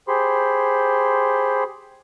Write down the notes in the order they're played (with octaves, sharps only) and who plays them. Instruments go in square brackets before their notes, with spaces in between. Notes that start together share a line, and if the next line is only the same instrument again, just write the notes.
[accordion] G4 G#4 C5 B5 C6